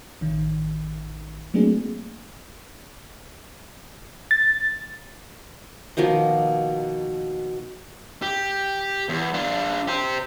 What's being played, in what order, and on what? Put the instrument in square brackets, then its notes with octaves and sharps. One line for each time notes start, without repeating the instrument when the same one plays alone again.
[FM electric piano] A1 D#3
F#3 A3 A#3 C4 D4 G#4
A6
[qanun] B2 D#3 F3 A#3
[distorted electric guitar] G4
E2
D4 F4
G4 C5